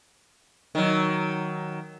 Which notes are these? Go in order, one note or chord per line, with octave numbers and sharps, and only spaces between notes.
D#3 F#3